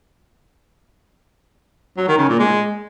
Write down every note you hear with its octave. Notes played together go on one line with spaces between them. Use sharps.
F#3
D#3
C#3
A#2
G#3